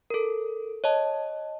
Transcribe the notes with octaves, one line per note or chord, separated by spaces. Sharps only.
A4 A#4
C#5 D#5 A5